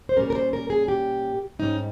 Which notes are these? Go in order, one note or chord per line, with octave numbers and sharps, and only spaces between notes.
C5
A#2 G3 C#4 A#4
A#4
C5
A#4
G#4
G4
G#2 G3 C#4 D#4